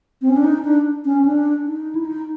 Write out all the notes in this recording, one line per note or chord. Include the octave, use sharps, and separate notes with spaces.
C4
C#4
D4
D#4
D4
C#4
D4
D#4
E4
D#4